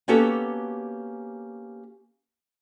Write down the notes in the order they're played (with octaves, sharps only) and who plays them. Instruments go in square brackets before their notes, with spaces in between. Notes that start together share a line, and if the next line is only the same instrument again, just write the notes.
[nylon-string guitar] A#3 B3 C#4 F#4 G4 A4